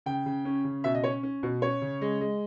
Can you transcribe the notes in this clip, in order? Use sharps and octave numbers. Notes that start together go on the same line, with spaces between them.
C#3 G5
C#3
C#4
C#3
B2 E5
D#5
C#4 C#5
C#4
B2
C#4 C#5
C#3
G#3
G#3